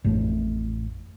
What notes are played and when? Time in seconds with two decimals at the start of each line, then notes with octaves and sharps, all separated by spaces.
0.04 A1 F2 A2 A3